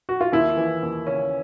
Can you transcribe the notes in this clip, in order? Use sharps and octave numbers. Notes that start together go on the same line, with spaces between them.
F#4
F4
D#2 E4
E3
D#2
C#3 C#4